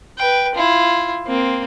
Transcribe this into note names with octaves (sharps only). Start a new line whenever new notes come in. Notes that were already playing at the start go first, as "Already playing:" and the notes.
B4 G5
E4 F4
A#3 C4